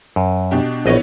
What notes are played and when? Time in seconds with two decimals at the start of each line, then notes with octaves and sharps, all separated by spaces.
0.16 F#2
0.51 B2 D4 G4
0.86 A#1 E3 B3 C#5 D#5